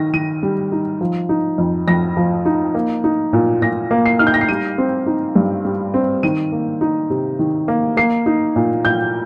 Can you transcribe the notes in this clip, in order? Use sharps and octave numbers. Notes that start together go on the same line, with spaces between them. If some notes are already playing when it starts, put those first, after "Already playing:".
Already playing: D#3 A#6
D#3 D#7
G3
D#4
F3
D#4
F2
F2 A#6
F3
D#4
A#3
D#4
A#2
A#2 A#6
A#3
C7
D#4 F6
G6
A#6
C7
G3 D#7
C4
D#4
G2
G3
C4
D#3 D#7
A#3
D#4
C3
D#3
A#3
A#3 C7
D#4
A#2
A#2 G6